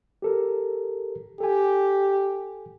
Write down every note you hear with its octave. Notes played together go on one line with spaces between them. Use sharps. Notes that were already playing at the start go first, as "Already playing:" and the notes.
G4 A4 A#4
G4 A4 G#5